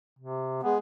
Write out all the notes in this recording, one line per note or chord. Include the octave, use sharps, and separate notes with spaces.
C3
G#3 B3